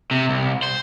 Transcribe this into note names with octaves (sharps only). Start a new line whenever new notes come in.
C3
C2
C5